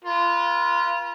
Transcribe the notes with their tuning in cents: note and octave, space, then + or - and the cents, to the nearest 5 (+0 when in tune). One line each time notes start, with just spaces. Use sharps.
F4 -15 B4 -40